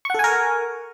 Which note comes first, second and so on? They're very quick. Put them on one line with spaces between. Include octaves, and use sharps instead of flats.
C#6 F#5 A4 G#5 A#4